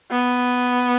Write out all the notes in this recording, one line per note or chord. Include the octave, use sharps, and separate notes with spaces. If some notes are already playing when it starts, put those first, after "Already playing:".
B3